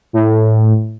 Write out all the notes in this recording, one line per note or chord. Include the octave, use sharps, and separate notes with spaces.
A2